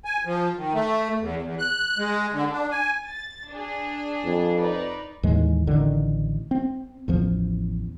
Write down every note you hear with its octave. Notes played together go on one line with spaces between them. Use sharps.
G#5
F3
D#3
A3
E2
E2
F#6
G#3
D3
D4
G#5
A6
D4 G#4
F2
D#4 B4 D5
D#2 A2 E3 G#3
A1 D3 D#3
C4
A1 E2 F3